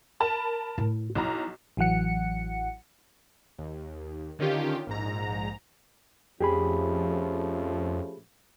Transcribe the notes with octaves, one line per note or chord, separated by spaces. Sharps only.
A#4 A5 B5
A2
B1 F3 E4 A#5
A1 E3 F#3 F#5 C#7
D#2
D3 D#3 C#4 F4 G4
A#1 G#2 A#5
F2 F3 A3 C#4 G4 G#4 B5